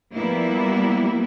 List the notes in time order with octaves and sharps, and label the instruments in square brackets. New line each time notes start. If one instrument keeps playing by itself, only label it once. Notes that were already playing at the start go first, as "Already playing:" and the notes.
[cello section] F3 G3 A#3 B3 E4